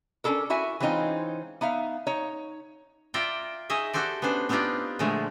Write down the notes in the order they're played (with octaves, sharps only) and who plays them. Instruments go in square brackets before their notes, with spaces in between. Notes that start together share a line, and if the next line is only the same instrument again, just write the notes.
[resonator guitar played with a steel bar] C#4 D4 E4 A4 A#4
E4 F#4 E5 G#5
E3 G#3 C4 C#4 D#4 F4
B3 D#4 E5 F5
D#4 C#5
[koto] F4 D5 E5 G5 A#5
D#4 G#4 C#5 D#5 E5
F#4 G4 A4 C5 D5
B3 C#4 D4 C5
B3 C4 D4 D#4 F4 G4
A#2 D3 F3 G#3 A3